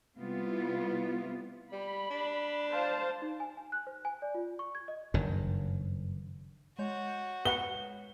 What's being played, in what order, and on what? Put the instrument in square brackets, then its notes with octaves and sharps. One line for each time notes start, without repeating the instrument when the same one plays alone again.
[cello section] C3 G3 A3 B3 E4 F4
[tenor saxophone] G3 [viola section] B5
[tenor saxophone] D4
[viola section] C5 F5 A5
[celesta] D#4
G#5
G#5
F#6
C5
G#5
D5
F4
C#6
G#6
D#5
[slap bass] F#1 G2 D#3
[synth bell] G#3 C#5 G6 [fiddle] F#4
[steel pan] B4 F#5 [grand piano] G7